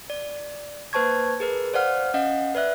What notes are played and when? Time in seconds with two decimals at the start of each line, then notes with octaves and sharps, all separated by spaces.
0.10 D5
0.93 A#3 B4 C5 A5 C#6 G#6
1.40 G#4 A#4 B4
1.74 C5 D5 F5 F#5 F6
2.14 C#4 D#5 F5 F#5
2.55 B4 D5 E5 F#6